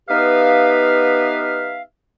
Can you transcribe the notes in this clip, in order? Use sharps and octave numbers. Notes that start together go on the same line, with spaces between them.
B3 D#4 G4 B4 E5 F5